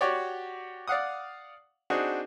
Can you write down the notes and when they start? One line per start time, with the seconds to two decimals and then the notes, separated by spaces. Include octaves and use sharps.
0.01 F#4 G4 C#5 D5
0.88 D5 F5 F#5 D#6
1.90 C4 D4 D#4 F#4 G#4